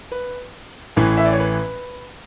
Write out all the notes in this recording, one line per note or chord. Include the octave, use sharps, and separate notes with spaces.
B4
A1 A2 E3 B4
E5
D5
C#5
B4